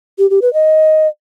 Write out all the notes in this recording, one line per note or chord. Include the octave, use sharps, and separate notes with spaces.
G4
G4
B4
D#5